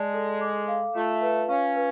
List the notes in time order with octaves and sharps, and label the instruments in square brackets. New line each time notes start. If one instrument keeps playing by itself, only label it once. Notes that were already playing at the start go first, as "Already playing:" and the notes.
Already playing: [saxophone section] G#3 [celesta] D5 A5
[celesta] A4
D6
F5
[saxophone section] A3 [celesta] F4
[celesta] B4
[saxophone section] C#4 [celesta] F5
[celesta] B4